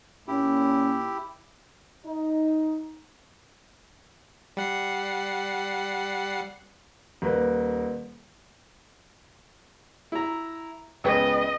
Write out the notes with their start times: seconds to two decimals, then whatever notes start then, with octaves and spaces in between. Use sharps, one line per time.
0.28 A#2 C#4 E4 G4
2.05 D#4
4.57 G3 F#5 C7
7.22 D#1 A#3 B4
10.12 E4 A#5
11.04 C#2 B3 D#5 G5